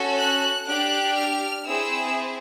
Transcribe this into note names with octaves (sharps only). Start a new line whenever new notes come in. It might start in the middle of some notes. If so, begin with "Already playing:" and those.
Already playing: C#4 F#4 A4
F#6
D4 G4 F#6
F6
C4 E4 G#4 E6